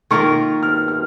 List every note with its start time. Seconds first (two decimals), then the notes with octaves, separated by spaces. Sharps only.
0.11 D#3 A#3 F4 A#4 C#6
0.63 F6
0.88 F6